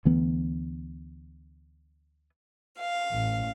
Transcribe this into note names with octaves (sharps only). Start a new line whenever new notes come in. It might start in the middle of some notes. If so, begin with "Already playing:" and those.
D2 E3 B3
F5
A1